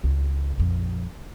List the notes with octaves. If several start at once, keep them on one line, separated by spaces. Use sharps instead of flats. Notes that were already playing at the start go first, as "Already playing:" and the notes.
C#2
A#1 F2